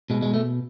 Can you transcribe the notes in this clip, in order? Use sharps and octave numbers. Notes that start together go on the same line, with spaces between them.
B2 G#3
G#3
A3